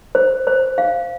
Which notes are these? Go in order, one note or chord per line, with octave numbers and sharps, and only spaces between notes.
C5
C5
F5